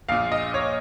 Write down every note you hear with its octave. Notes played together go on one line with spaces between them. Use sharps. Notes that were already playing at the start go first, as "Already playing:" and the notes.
A#1 A#2 F5
D#5
C#5